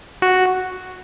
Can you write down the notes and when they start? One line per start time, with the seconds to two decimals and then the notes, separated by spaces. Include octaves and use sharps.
0.22 F#4